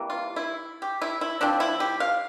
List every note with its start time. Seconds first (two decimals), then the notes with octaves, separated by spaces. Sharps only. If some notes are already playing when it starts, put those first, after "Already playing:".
Already playing: C3 E3 G3 A#3
0.10 F4
0.36 E4
0.82 G4
1.02 E4
1.21 E4
1.41 F3 C4 D4
1.60 E4
1.80 G4
2.00 F5